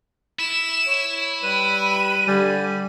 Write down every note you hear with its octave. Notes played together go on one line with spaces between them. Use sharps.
E4 E7
C#5
G3 B4 B5 D#7
D3 G3 G#5